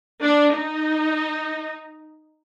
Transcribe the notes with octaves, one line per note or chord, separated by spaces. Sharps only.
D4
D#4